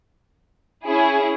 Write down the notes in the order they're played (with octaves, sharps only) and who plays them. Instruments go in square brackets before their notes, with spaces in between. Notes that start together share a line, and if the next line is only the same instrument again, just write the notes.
[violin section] C#4 E4 G#4